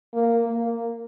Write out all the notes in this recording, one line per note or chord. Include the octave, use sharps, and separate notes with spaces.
A#3
A#3